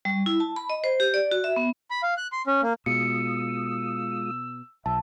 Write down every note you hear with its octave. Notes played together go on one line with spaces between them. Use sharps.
G3
E4
A5
B5
D#5
C5
G4
D5
F#4
E5
B3
B5
F5
F#6
C6
C#4
A#3
B2 G#3 F4 D#6 E6 C#7
B1 E5 A5